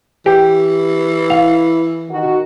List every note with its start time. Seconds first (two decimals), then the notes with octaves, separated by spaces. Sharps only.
0.26 E3 G4
1.30 E4 F5
2.09 D#3 F#4